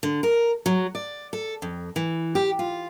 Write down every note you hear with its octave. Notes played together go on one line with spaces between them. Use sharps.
D3
A#4
F#3
D5
A4
F2
E3
G4
F4